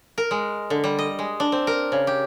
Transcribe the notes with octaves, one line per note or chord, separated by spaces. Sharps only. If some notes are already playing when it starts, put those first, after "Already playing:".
A#4
G#3
D3
G3
D#5
G#3
D4
C4
A#4
C#3
G4